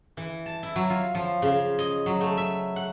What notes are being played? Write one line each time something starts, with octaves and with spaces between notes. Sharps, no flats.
E3
A5
E4
F#3
F4
F3
C#3
D#5
F#3
A3
E5
F#5